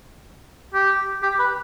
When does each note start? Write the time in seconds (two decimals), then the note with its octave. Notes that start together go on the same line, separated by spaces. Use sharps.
0.74 G4
1.23 G4
1.39 B4